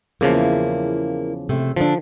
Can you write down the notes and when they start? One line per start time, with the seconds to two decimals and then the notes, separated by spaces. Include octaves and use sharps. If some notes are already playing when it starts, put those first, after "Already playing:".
0.21 E2 C#3 F3 A#3 E4
1.49 C3 A3
1.76 D3 F3 D4